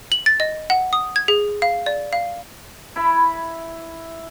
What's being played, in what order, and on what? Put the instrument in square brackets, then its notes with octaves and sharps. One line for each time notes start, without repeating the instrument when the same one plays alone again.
[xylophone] F#7
A6
D#5
F#5
D#6
G#6
G#4
F5
D5
F5
[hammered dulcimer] E4 B5